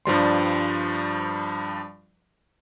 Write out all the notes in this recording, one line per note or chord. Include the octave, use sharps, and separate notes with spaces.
G2 F3 G3 C6